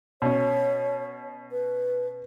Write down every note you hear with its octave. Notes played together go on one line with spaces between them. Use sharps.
B2 C#4 C#5
B4